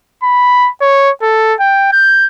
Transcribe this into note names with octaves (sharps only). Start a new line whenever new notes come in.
B5
C#5
A4
G5
G6